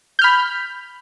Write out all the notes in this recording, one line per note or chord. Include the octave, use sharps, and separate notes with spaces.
B5 F6 G6